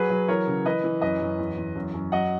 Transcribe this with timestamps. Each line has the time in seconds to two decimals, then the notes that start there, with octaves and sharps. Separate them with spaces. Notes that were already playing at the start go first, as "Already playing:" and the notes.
Already playing: F#3 G#4 B4
0.10 F#3
0.28 E3 A#4 C#5
0.47 C#3
0.65 E3 B4 D#5
0.84 E3
1.01 F#2 B4 D#5
1.21 F#2
1.39 E2
1.57 E2
1.76 F#2
1.94 F#2
2.12 F#3 D#5 F#5